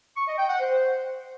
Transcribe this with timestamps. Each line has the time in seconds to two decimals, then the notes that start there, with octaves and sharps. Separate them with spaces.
0.17 C#6
0.28 D#5
0.38 G5
0.49 F#5
0.60 C5